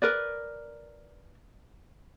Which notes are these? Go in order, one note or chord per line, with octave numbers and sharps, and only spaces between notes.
A#4 B4 D5